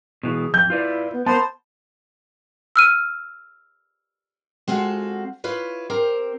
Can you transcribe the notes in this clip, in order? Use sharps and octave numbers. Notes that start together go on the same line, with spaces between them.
B2 E3 G#4
F2 G6
E4 F4 B4 D5
B3
B3 A#4 C5 A5 B5
E6 F6 D#7
G#3 C4 F4 F#4 A4
E4 F4 B4 C#5
C4 G4 A#4 C5